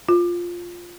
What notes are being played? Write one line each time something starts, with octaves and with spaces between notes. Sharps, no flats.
F4